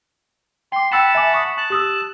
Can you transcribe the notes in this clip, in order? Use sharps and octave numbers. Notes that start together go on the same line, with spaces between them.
G5 C6 D6
F#5 G5 A5 B5 E6 E7
E5 G#5 D6
C#6 D#6
A5 F#6
G4 D#6 E6